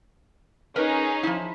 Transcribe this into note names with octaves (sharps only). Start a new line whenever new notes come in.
C#4 D#4 G#4 A#4 B4
F3 E4